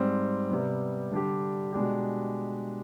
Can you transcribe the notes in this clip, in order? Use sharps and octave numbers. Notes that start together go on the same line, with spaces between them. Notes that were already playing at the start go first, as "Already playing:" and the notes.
Already playing: G#2 G3 C4
C3 G3 B3
D3 G3 D4 G4
B2 G#3 D4 G4